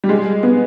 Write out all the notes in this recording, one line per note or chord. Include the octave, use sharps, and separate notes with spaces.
G3
G#3
B3